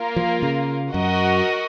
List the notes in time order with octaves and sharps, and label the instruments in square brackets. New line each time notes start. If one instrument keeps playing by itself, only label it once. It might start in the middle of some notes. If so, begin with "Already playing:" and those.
Already playing: [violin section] A#3 F4 A#4
[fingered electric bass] F3
C#3
[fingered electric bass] F#2 [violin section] F#4 A#4 D#5 F#5